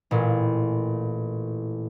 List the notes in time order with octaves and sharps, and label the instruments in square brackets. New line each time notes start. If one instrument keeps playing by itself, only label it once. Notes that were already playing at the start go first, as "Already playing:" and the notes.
[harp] A1 A#2